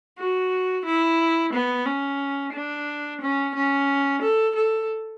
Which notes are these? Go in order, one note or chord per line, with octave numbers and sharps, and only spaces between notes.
F#4
E4
B3
C#4
D4
C#4
C#4
A4
A4